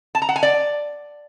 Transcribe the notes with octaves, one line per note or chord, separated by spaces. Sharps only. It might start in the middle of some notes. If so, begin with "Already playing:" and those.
A5
A#5
F#5
G#5
D5